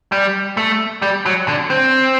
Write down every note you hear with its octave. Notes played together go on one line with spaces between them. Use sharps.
G3
A3
G3
F#3
D3
C4